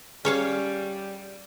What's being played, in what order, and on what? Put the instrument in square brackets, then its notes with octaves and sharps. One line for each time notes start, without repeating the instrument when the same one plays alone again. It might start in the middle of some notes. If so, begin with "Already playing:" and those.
[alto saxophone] G3 [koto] C#4 C#5 F5 [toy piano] G#4